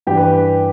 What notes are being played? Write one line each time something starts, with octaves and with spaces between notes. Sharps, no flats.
G2 E3 G4
B4